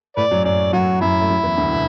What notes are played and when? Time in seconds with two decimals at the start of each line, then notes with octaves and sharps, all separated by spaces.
0.17 A2 A3 B4 D5
0.31 F#2 F#3
0.45 F#2 F#3 D5
0.73 F#2 F#3 F#4
1.01 F#2 F#3 E4
1.22 A3
1.30 F#2 F#3
1.43 E2 E3
1.57 D2 D3
1.72 B2